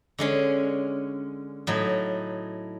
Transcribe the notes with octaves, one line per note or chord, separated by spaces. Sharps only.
D3 G#3 C#4
A2 F#3 D#4